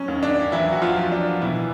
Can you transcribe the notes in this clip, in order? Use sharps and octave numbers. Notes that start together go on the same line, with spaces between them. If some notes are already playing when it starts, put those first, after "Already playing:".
Already playing: F#3 C#4
D#2
D4
E3 F#3 E4
F#4
F3 F4
F#3
D4
B2 E3 E4